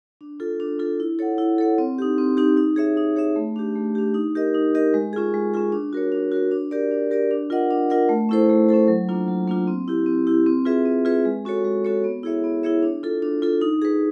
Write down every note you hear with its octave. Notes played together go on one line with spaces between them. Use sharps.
D4
F4 A4
D4
F4 A4
E4
A4 C#5 F#5
E4
A4 C#5 F#5
C4
D#4 G4
C4
D#4 G4
D#4
G#4 C#5 E5
D#4
G#4 C#5 E5
A3
D4 G4
A3
D4 G4
D#4
G4 A#4 D#5
D#4
G4 A#4 D#5
G#3
C#4 F4 G#4
G#3
C#4 F4 G#4
D4
F#4 A#4 C#5
D4
F#4 A#4 C#5
D4
G4 A#4 D5
D4
G4 A#4 D5
D4
F4 A#4 D#5 F#5
D4
F4 A#4 D#5 F#5
A3
C#4 E4 A4 C5
A3
C#4 E4 A4 C5
F#3
A#3 D4 F4
F#3
A#3 D4 F4
C4
E4 G4
C4
E4 G4
C4
F4 G#4 B4 E5
C4
F4 G#4 B4 E5
G#3
C#4 F#4 A4 C#5
G#3
C#4 F#4 A4 C#5
B3
E4 G#4 C#5 E5
B3
E4 G#4 C#5 E5
D4
F4 A4
D4
F4 A4
D#4
G#4 B4